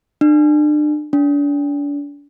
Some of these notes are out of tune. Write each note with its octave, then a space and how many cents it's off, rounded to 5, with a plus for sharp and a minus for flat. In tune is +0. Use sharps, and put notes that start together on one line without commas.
D4 +35
D4 -35